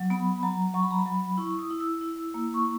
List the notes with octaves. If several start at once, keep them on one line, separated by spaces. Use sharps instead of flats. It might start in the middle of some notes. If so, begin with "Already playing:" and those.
Already playing: F#3
B3 B5
F#3 A#5
F#3 C#6
B5
A#5
B5
F#3
E4 C#6
D#6
E4
E6
E4 E6
A#3
C#6